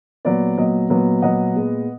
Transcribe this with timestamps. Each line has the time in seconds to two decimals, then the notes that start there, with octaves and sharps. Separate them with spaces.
0.25 A#2 F#3 B3 D5
0.58 A#2 F#3 B3 D#5
0.90 A#2 F#3 B3
1.22 A#2 F#3 B3 D#5 F#5
1.55 A#2 G#3 B3